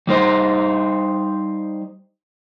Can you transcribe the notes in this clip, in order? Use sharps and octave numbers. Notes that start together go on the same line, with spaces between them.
G3 D#4 C5